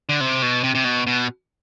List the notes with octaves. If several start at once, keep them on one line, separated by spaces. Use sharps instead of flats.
D3
C3
B2
C3
C3
B2
B2